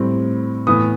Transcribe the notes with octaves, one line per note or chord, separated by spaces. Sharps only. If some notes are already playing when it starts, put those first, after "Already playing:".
Already playing: A2 G3 C4
A2 E3 B3 D#6